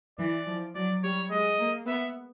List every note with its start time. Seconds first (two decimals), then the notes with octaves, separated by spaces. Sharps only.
0.18 E3 D5
0.47 F3
0.75 F#3 D5
1.03 G3 C#5
1.31 G#3 D#5
1.59 A#3
1.87 B3 E5